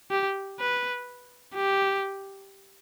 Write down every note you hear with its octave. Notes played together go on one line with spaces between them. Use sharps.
G4
B4
G4